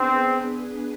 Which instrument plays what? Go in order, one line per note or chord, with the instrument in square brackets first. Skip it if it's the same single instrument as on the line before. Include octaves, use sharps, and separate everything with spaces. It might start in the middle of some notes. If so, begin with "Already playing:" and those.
Already playing: [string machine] B3 D4 G#4 B4 [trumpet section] C4